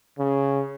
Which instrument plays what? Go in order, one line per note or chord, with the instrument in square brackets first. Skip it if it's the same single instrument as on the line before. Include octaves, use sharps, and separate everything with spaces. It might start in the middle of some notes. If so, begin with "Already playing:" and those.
[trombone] C#3